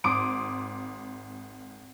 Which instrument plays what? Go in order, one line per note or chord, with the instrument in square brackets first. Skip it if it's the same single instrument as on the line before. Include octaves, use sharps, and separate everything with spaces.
[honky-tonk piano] G#1 C6 D6 D#6 D7